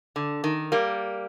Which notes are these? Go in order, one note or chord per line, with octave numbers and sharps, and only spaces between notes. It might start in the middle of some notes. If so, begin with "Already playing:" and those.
D3
D#3
G3 A#3